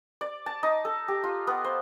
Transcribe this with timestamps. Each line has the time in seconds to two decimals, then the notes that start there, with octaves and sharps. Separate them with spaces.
0.21 D5
0.46 A5
0.63 D#4
0.85 A4
1.08 G4
1.24 F4
1.47 B3
1.64 C5